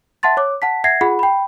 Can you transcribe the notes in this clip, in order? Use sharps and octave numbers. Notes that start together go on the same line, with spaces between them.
E5 F#5 A5 C6 A6
C#5 D6
F#5 A5 B6
E5 F#5 G#6 A#6 C7
F4 G#4 F#5 B5
G5 B5